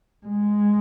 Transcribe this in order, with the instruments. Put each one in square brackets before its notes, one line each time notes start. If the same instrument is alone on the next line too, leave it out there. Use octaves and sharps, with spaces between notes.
[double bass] G#3